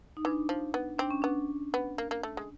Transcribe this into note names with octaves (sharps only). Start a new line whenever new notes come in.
D#4
E3 D4
F3
B3
C4 D4
C#4
B3 D4
B3
A#3
A#3
A3
G#3